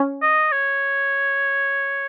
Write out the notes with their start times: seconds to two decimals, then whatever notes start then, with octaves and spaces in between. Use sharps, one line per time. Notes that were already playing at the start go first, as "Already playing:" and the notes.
Already playing: C#4
0.22 D#5
0.52 C#5